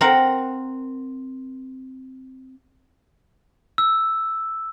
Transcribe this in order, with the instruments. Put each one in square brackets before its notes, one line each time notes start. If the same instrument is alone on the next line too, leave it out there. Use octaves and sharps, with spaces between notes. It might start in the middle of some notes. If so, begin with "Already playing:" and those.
[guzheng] C4 A#4 F#5
[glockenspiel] E6